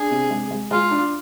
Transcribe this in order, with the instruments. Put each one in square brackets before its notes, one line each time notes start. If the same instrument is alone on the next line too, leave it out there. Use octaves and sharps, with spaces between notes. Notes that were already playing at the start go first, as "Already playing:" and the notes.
Already playing: [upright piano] D4 [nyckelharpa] G#4
[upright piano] C3
G#3
G#3
[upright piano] G#3 [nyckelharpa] F4
[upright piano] D4